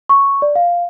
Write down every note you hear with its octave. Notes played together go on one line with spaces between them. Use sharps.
C#6
D5
F5